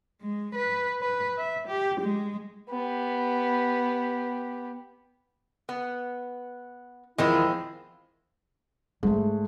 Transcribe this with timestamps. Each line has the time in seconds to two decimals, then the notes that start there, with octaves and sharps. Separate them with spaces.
0.22 G#3
0.55 B4
1.02 B4
1.38 E5
1.68 G4
2.01 G#3
2.70 B3 G4
5.69 B3
7.18 E2 D#3 F3 G#3 C4 E4
9.03 G#2 G3 A3